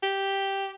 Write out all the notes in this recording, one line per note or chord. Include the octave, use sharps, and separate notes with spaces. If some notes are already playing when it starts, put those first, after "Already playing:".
G4